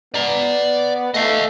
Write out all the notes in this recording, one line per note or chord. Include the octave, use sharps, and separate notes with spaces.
B3 D5 A#5
A3 D#5 F5